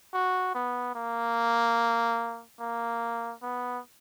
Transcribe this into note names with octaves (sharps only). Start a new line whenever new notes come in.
F#4
B3
A#3
A#3
B3